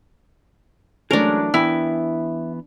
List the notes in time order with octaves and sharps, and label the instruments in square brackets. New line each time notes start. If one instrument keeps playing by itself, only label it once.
[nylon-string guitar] E3 F#3 A3 [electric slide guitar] G#3 C#4 G#4 [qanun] D4 A#4
[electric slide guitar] E3 B3 [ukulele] E4 [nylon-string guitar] G5 G#5